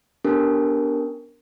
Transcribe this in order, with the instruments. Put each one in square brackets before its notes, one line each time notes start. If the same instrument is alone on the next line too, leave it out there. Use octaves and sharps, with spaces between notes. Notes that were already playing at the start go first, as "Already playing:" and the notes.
[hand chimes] B3 C#4 D4 G4 A4 A#4